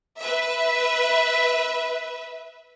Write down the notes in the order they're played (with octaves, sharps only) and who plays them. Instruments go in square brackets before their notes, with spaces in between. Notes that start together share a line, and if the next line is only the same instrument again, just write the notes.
[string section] B4 E5